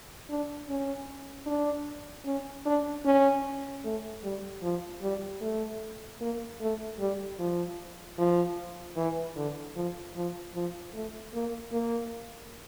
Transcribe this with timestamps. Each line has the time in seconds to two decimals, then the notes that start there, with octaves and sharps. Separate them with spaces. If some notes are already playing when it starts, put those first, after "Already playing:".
0.29 D4
0.69 C#4
1.47 D4
2.26 C#4
2.66 D4
3.05 C#4
3.84 A3
4.23 G3
4.63 F3
5.02 G3
5.41 A3
6.21 A#3
6.60 A3
6.99 G3
7.39 F3
8.18 F3
8.96 E3
9.36 D3
9.76 F3
10.15 F3
10.54 F3
10.94 A3
11.34 A#3
11.72 A#3